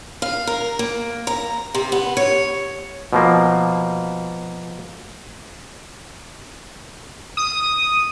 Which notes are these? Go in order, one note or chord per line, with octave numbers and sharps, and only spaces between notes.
F5
A#4
A#3
A#5
C3
B3
C#5
B2 F3 A#3
D#6